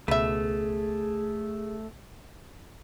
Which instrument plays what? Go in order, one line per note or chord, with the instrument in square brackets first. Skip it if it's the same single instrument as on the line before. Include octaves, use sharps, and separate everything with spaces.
[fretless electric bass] C#2 B2 [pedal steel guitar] A3 [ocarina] G#4 [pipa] B4 E5